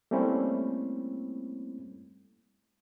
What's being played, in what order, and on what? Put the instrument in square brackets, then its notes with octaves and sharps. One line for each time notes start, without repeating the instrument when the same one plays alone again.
[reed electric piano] G3 A3 A#3 C4 C#4 E4